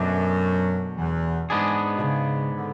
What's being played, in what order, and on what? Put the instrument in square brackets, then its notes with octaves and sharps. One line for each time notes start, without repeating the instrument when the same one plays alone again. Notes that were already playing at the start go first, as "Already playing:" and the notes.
Already playing: [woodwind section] F#2 F#3 [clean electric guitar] B2 A3 D4
[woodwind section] E2 E3
[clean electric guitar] G#2 G#3 B3 D4 G#4
[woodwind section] B2
C#3
D3